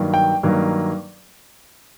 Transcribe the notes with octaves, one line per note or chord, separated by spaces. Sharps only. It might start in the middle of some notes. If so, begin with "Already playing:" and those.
Already playing: G2 D#3 F#3 A#3
G5
G2 D#3 F#3 A#3